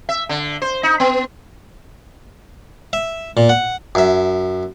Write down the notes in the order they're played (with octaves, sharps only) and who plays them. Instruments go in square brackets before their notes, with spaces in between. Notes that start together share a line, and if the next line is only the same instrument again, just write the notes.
[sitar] E5
D3
C5
D#4
B3
[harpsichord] E5
A#2
F#5
F#2 E5